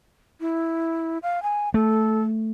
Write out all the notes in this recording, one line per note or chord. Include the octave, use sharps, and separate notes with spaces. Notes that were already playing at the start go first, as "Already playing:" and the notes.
E4
F5
G#5
A3 A4